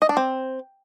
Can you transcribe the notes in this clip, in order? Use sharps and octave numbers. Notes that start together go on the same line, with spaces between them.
D#5
D4
C4